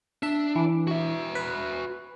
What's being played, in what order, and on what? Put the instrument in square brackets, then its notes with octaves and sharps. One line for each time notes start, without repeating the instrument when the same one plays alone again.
[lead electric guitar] D4 [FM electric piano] E5
[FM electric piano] E3 D6
[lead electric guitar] F#4 E5
[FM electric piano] B4